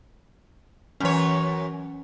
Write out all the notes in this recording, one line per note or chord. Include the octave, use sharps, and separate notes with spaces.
F#2 E3 C#4 C#5